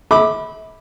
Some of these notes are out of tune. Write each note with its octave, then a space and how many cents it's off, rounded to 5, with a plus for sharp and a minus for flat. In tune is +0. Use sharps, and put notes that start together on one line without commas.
E5 -40 B5 +0 D6 +10